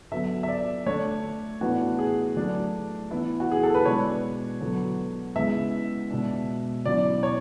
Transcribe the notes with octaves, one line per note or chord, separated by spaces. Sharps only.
D3 F#3 B3 E5
E5
D5
D3 A3 D4 C#5
A2 E3 B3 D4 F#4
G#4
F#3 A3 D4
E3 B3 E4
F#4
G#4
A4
B4
B2 G#3 D4 C#5
D3 F#3 B3
C#3 G#3 B3 E4 E5
B2 G#3 D4
B2 F#3 C#4 E4 D5
C#5